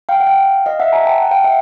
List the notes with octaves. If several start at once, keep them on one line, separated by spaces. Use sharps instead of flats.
F5 G5
F#5
F5 G5
D#5 F5
E5 F#5
G#5 A#5
G5 A5
F#5
F5 G5
E5 F#5